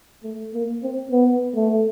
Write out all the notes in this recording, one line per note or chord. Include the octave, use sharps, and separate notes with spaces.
A3
A#3
C4
B3
A3